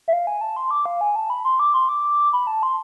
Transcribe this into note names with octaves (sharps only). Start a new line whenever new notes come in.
E5
F5
G#5
A5
C6
D6
F5
G#5
A5
B5
C6
D6
C6
D6
B5
A5
C6